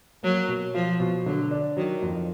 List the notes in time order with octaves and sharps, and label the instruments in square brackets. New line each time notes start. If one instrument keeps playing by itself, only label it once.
[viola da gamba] F#3 [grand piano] A#3
[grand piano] B2
[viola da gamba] F3 [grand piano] F4
[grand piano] B2
[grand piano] D3 [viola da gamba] F#3
[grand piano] D4
[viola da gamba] D#3 [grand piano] F#3
[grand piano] F2